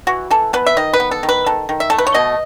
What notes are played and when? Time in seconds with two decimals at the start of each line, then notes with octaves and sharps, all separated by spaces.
0.07 E3 F#4
0.31 E3 A4
0.53 B3 B4
0.66 E5
0.77 D#3 D#5
0.93 B4
1.00 B3
1.11 A4
1.23 D#3
1.29 B4
1.46 D#3 A4
1.69 D#3
1.80 E5
1.90 A3 A4
1.98 B4
2.07 C#5
2.14 B2 D#5